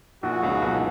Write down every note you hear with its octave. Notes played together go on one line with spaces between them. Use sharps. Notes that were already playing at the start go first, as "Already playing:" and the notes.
A#1 A#2 F#4
C#2 C#3
B1 B2
E3